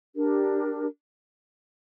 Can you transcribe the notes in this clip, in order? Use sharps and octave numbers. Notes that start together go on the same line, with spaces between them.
D4 G4 A#4